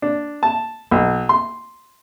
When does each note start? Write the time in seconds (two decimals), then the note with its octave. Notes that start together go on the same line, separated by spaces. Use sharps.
0.02 D4
0.43 A5
0.91 B1
1.29 C6